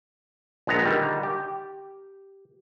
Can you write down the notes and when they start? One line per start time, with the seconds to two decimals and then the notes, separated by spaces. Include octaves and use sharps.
0.67 A#1 G#3 B3 A#5
0.85 D3 D#3 G3
1.23 G4